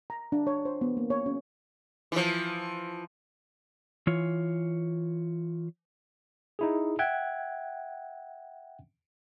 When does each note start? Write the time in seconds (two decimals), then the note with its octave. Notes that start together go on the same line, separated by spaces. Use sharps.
0.10 A#5
0.32 D4
0.47 C#5
0.65 C5
0.81 B3
0.97 A#3
1.10 C#5
1.26 C#4
2.12 E3 F3
4.07 E3 F4 C#5
6.59 D#4 E4 G#4
6.99 E5 F#5 G5 F#6 G#6